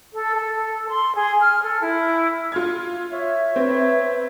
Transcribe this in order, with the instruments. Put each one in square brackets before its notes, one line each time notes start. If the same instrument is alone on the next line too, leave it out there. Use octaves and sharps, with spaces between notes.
[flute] A4
A4
C6
G#4
F6
A4
E4
[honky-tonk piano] F4 F6 G#6
[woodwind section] C#5 E5
[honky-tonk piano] C4 [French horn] B4